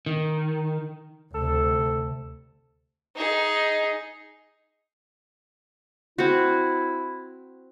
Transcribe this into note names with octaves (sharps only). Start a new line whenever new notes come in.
D#3
D2 C3 A4
D#4 G#4
C4 E4 F#4